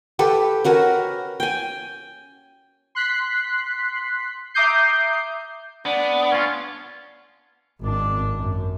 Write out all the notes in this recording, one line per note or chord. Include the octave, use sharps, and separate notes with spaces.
G4 A4 B4
C#4 F#4 A#4 B4
G5 G#5
C6 F#6 B6 C7
E5 A#5 D6 D#6 G6 C7
B3 D4
C#4 F4
G#1 D4
F#2